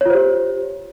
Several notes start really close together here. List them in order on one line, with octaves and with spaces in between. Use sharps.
C#5 F4 C5 G4